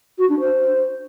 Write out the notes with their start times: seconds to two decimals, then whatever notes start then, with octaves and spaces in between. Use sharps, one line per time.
0.18 F#4
0.29 D4
0.40 C5